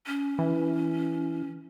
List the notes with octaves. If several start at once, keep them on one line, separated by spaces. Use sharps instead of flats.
C#4
E3